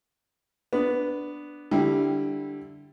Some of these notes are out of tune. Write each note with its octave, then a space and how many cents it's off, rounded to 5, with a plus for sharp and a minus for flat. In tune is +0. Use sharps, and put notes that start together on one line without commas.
B3 +0 D4 +0
D3 +0 G3 +0 E4 -5